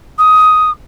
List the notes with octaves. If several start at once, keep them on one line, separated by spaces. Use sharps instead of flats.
D#6